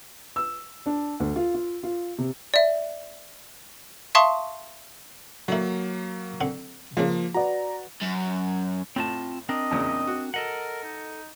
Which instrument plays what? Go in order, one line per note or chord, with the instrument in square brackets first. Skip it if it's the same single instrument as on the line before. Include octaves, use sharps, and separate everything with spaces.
[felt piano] E6
D4
D2
F4
F4
F4
C3
[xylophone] D5 E5
E5 F5 A5 C6 C#6 D#6
[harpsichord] D3 E4 [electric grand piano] F#3 A#3
[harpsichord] D3 C4 F#5
[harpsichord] C#2 C#3 [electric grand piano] F3 A#3
[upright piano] F#4 B4 D5 [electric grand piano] A#5
[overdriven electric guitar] F#2
[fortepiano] A2 [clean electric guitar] C4 F4 A5
[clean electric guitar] C4 D4 A#4 [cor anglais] D#5
[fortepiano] E2 A#2 C#3
F#4
[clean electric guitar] A4 D#5 F#5 [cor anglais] A#4
[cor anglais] D#4